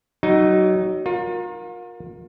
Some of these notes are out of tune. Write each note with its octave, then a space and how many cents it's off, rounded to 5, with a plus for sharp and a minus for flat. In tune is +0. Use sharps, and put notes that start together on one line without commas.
F#3 +25 D#4 +0
F4 +40 A#4 +10